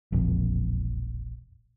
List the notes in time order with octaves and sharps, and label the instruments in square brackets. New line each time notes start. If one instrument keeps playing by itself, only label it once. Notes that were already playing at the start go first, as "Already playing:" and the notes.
[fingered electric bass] E1 A#1 F2